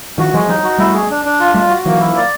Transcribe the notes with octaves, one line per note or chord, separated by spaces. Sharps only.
D#3 F3 F#4
E3 F#3 G#3
F3 G3 D#4
F#4
G3 A3 E4
G#4
D4
D4
F4
G3 A3 F4
F#4
E3 F#3 A#3
E4
D5